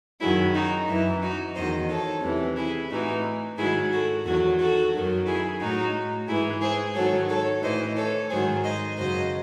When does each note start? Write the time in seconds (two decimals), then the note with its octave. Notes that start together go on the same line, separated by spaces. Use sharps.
0.21 F#2 D#3 F#3 E4 G#4
0.54 D#4 F#4
0.89 F#2 E3 E4
1.22 D#4 F#4
1.56 E2 D#3 F#3 C5 D#5
1.89 A4 C#5
2.23 E2 C3 E3
2.57 E4 G#4
2.90 A2 E3 D#4 F#4
3.58 G#2 D#3 F#3 E4 G#4
3.92 F#4 A4
4.25 E2 D#3 F#3 F#4 A4
4.60 F#4 A4
4.93 F#2 D#3 F#3
5.27 E4 G#4
5.61 A2 F#3 D#4 F#4
6.28 G#2 E3 E4 G#4
6.62 G#4 C5
6.95 G#2 D#3 F#3 A4 C#5
7.29 A4 C#5
7.63 A2 E3 C5 D#5
7.97 A4 C#5
8.30 G#2 D#3 F#3 G#4 C5
8.64 C5 D#5
8.98 F#2 C#3 F#3 C5 D#5